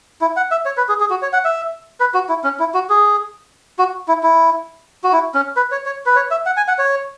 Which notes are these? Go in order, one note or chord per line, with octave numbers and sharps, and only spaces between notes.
E4
F#5
E5
C#5
B4
G#4
G#4
F#4
C#5
F#5
E5
B4
F#4
E4
C#4
E4
F#4
G#4
F#4
E4
E4
F#4
E4
C#4
B4
C#5
C#5
B4
C#5
E5
F#5
G#5
F#5
C#5